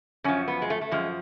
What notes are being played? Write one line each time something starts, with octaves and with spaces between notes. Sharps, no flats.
F#2 F3 C#4
B3
G#3
A3
A3
F#2 F3 G#3